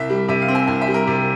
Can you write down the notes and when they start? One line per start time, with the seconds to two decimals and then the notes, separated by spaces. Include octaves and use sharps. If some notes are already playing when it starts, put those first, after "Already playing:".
Already playing: C2 E5
0.10 G3
0.28 C3 E5
0.42 F5
0.48 C4
0.55 G#5
0.68 C2 G#5
0.81 E5
0.88 G3
0.94 A#4
1.07 C3